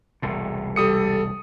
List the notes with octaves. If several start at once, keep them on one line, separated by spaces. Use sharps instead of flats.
E1 C2 A2
G3 A4 D#6 C#7